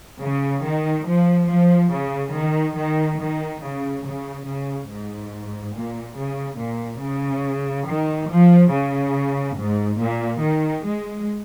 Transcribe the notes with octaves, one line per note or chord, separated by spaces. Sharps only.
C#3
D#3
F3
F3
C#3
D#3
D#3
D#3
C#3
C#3
C#3
G#2
A#2
C#3
A#2
C#3
D#3
F3
C#3
G#2
A#2
D#3
G#3